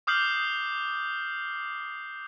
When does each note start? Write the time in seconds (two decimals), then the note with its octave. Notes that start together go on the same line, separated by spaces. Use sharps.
0.07 D6 D#6 F6 G6 C7 F#7